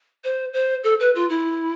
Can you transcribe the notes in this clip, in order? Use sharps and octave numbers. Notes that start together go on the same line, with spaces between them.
C5
C5
A4
B4
F4
E4